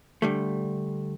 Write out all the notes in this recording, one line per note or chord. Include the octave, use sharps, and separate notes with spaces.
D3 G3 A3